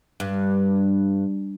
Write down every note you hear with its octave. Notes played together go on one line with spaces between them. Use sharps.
G2